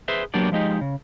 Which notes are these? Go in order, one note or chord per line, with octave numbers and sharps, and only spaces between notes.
G#4 B4 C5 E5
F#3 A#3 B3 D4 G4 D5
F3 G#3 D#4 G4
C#3